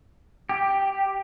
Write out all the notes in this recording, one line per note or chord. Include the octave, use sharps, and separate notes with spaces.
G4